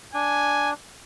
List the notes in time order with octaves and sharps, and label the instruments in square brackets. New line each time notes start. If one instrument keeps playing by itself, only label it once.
[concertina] D4 [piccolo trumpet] G#5